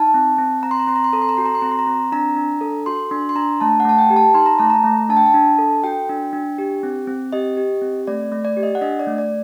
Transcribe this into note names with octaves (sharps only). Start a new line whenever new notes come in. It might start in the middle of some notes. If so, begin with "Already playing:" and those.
Already playing: D#4 A5
C4
C4
C4 A#5
C6
A#5
C4 C6
A#5
C6
A4 A#5
C6
A#5
F#4 C6
A#5
C6
C4 A#5
C6
A#5
C4
D4 A#5
D4
A4
F#4 C6
D4 C6
C6
D4 A#5
A3 A5
F#5
A3 A5
G5
G4
A5
D#4 C6
A#5
A3 A5
A#5
A3
D4 A5
G5
A5
D4
A4
F#4 G5
D4
D4
G4
C4
C4
G4 D#5
G4
C4
A3 D5
A3
D5
G4
D#5
F#5
D4 D#5
D5
A3
D5